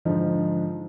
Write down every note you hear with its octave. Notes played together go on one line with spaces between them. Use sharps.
G#2 D3 F3 D#4